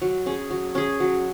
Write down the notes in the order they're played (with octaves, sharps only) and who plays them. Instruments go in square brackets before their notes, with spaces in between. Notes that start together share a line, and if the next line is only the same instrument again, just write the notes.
[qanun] F#3
C#4 G#4
F#3
C#4 G#4
F#3